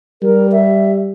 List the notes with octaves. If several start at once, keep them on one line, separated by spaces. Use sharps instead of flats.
G3 A#4
E5